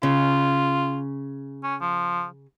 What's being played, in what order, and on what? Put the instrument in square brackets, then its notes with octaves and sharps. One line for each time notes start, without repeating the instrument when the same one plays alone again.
[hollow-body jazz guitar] C#3 [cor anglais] F4
[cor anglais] C#4
F3